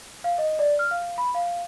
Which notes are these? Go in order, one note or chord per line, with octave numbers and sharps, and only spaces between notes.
F5
D#5
D5
F6
F5
B5
F5